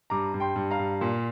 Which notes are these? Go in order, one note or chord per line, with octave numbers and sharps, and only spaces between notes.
G2 A#5 D6
G2
G5 C6
G2
F5 A#5
G2
A#2